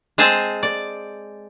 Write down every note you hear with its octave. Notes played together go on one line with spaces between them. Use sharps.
G#3 C4 G#4 C5 A5
D5